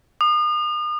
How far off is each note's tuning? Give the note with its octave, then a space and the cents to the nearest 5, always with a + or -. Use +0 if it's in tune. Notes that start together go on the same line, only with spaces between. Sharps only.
D#6 -40